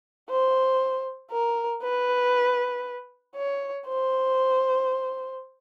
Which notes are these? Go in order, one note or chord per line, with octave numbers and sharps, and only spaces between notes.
C5
A#4
B4
C#5
C5